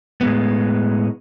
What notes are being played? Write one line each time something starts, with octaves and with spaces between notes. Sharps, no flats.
A2 G#3 B3